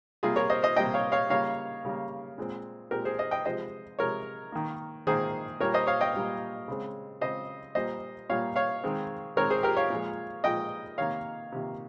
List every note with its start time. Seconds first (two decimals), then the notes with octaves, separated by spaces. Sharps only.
0.23 C3 G3 A#3 F4 G#4
0.36 A#4 C#5
0.50 C5 D#5
0.63 C5 D#5
0.76 C3 G3 A#3 D#5 G5
0.94 C#5 F5
1.12 C#5 F5
1.30 C#3 G3 A#3 C#5 F5
1.85 C#3 G3 A#3
2.38 A#2 G#3 C4
2.91 A#2 G#3 C4 G4 A#4
3.05 G#4 C5
3.19 C5 D#5
3.31 D#5 G5
3.45 C3 F3 G#3 C5 D#5
3.99 C3 F3 G#3 A#4 C#5
4.52 D#3 A#3
5.07 D#3 A#3 G#4 C5
5.60 A#2 G3 A#3 A#4 C#5
5.74 C5 D#5
5.87 C#5 F5
6.01 D#5 G5
6.14 A#2 G3 A#3
6.68 C#3 G#3 C4
7.21 C#3 G#3 C4 C5 D#5
7.75 A#2 G3 A#3 C5 D#5
8.30 A#2 G3 A#3 C#5 F5
8.56 C#5 F5
8.84 D#3 G#3 C4
9.36 D#3 G#3 C4 A#4 C#5
9.50 G#4 C5
9.63 G4 A#4
9.77 C#5 F5
9.90 A#2 F3 G#3
10.44 A#2 F3 G#3 D#5 G5
10.98 C3 D#3 A#3 C#5 F5
11.52 C3 D#3 A#3